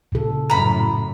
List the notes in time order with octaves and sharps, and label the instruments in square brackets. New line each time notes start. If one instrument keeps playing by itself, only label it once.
[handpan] A#2 C#3 A4
[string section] F#2 A2 [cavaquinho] A#5 B5